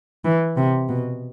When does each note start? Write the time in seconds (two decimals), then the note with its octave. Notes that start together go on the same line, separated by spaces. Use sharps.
0.25 E3
0.57 C3
0.89 B2